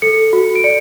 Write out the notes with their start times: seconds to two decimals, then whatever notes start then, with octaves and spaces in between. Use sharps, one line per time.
0.02 A4 C#7
0.33 F#4
0.55 D7
0.64 D5 C#7